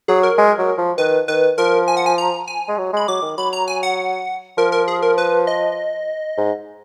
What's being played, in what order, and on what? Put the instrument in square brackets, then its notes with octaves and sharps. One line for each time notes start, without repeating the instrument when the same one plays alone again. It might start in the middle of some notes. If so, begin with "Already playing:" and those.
[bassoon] F#3 [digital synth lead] G#4
[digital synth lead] A#4
[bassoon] G#3
F#3
F3
[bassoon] D#3 [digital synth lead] B4
[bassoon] D#3 [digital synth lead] B4
[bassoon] F3 [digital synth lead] A#4
[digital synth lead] G#5
F#5
G#5
A#5
G#5
[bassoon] G#3
F#3
[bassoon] G#3 [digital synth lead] B5
[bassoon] F#3 [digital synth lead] D6
[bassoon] D#3
[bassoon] F#3 [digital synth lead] B5
[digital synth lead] A#5
G#5
F#5
[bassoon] F3 [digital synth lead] A#4
[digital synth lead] A#4
G#4
A#4
B4
D#5
[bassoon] G#2